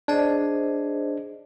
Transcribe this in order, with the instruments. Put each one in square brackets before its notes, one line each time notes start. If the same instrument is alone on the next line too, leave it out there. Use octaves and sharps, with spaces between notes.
[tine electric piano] D4 [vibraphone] G#4 C5 D#5